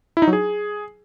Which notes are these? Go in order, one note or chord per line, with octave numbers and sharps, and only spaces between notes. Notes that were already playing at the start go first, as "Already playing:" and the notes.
E4
D#4
F#3
G#4